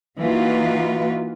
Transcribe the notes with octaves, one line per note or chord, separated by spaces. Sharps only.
E3 A#3 D#4 F4 F#4 B4